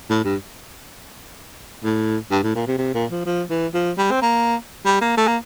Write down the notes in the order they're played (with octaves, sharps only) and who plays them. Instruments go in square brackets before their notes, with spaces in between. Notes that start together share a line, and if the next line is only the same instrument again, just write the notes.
[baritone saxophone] A2
G2
A2
G2
A2
A#2
C3
C3
A#2
F3
F3
E3
F3
G3
C4
A#3
G3
A#3
A3
A#3